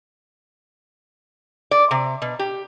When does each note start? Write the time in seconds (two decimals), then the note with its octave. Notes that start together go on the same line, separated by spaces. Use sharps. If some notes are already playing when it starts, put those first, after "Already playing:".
1.71 D5
1.91 C3
2.22 B2
2.39 G4